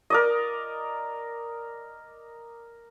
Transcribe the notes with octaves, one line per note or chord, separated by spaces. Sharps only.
A#4 D5 D#5